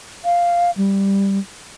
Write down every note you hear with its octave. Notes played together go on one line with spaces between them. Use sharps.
F5
G3